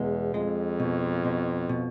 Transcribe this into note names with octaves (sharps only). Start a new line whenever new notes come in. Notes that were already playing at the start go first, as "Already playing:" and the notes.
Already playing: E2 B2 G#3
F2 G#3
B2
B2
B2